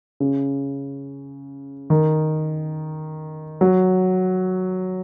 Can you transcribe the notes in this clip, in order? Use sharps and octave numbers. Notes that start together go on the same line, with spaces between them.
C#3
D#3
F#3